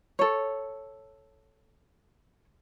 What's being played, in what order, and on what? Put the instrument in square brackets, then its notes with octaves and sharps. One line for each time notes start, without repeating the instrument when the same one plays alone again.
[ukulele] A4 C#5